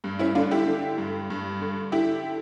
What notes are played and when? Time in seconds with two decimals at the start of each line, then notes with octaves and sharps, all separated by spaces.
0.04 G2
0.19 C#4 E4
0.35 D3 D4 F4
0.51 E4 G4
0.67 D3
0.98 G2
1.30 G2
1.61 D3
1.92 D3 E4 G4